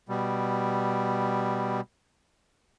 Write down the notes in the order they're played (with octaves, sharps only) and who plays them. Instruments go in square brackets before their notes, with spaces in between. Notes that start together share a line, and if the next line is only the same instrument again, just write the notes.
[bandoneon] B2 G3